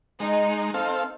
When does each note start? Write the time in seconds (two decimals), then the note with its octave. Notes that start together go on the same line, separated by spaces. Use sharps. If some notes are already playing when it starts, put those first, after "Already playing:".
0.20 G#3 D#4
0.74 C4 A4 F5